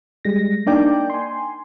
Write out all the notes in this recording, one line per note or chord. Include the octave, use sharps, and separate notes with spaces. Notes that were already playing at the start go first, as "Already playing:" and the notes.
G3 G#3 A#6
A#3 D4 D#4 D5 G5
G#5 C6